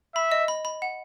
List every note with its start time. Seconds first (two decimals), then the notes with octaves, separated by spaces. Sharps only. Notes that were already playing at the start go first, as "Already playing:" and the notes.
0.15 E5 B5
0.32 D#5
0.48 B5
0.65 B5
0.82 F#5